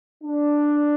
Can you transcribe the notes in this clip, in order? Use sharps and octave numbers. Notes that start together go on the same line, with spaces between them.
D4